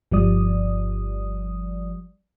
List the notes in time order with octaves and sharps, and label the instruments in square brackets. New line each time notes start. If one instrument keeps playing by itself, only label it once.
[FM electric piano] G1 F3 G3 D5 D#6